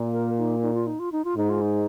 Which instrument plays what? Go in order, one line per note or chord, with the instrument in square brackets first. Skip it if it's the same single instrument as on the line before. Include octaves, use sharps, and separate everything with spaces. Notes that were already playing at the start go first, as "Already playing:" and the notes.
Already playing: [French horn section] A#2
[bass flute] A#4
D#4
D#4
F4
D#4
F4
D#4
F4
[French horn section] G#2 [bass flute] D#4
[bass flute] F4
D#4